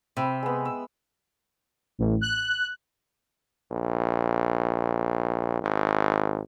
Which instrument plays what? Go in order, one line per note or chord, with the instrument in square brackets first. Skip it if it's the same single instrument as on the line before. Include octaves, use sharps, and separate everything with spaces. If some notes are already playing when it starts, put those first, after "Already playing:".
[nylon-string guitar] C3 [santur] E5 G5 B5
[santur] G#3 B3
E6
[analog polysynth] A1
F#6
[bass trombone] A#1
G#1